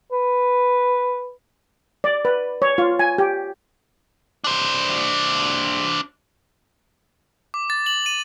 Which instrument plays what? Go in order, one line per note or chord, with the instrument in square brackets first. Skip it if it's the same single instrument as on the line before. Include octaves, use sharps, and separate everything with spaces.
[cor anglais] B4
[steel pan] D5
B4
C#5
F4
G#5
G4
[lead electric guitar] D4 C5
[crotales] D6
A6
F#7
D#7